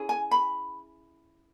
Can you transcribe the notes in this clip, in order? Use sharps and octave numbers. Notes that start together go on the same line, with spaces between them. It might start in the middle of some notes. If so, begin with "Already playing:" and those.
Already playing: C#4 E4 G#4
G#5
B5